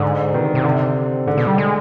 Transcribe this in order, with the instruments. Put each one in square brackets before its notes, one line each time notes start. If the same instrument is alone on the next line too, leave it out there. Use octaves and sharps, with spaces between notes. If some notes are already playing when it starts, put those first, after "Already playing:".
Already playing: [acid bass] G#2 [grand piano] D3
[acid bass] B2 [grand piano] D#3
[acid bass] C3
C3
[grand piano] D3
[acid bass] G#2 [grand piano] D3
[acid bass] B2
G3
G#3